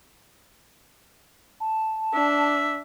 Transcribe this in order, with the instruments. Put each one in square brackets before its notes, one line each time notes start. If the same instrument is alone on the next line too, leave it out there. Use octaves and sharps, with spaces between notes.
[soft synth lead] A5
[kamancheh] D4 [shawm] E5